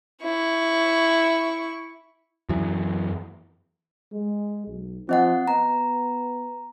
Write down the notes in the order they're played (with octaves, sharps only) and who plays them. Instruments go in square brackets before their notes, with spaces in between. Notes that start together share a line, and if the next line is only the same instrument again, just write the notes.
[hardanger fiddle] E4 C#6
[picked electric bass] F#2 E3
[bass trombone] G#3
B1
[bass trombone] F3 [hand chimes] C4 D#5 F#5
[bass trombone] B3 [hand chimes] A#5